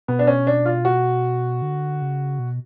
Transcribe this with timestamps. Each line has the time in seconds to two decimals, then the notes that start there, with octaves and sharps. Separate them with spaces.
0.08 B2 B3
0.19 D4
0.27 C#4
0.47 D4
0.65 F4
0.85 F#4
1.62 D3
2.02 C#3
2.39 B2